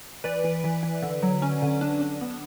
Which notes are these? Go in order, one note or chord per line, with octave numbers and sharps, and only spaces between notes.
E3 B4 D5
E3
E3
E3
D3
F#3
C#4
D3
D4
D4
B3